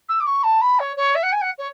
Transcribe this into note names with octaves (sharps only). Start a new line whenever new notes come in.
E6
D6
C#6
A5
B5
C#5
C#5
E5
F#5
G#5
F#5
C#5